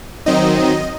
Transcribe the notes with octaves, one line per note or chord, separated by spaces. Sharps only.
D#3 F#3 C4 D#4 D#5